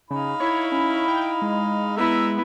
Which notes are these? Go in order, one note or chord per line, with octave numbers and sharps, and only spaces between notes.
C#3 D#4 F5 B5
E4 C#5
C#4
G5
G#3
B3 E4 E5 A#5 E6